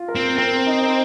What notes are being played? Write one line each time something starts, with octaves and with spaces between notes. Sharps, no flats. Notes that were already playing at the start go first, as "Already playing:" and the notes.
Already playing: F4
A#4
C4
C4 A#4
D#4